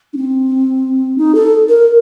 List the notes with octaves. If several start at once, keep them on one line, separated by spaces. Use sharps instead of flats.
D4
C4
D#4
A4
A#4